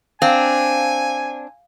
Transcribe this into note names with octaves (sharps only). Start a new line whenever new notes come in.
C4 D4 F5 G#5